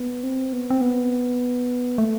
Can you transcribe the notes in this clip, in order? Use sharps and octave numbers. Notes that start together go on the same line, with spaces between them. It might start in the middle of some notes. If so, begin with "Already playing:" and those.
Already playing: B3
C4
B3
C4
B3
A3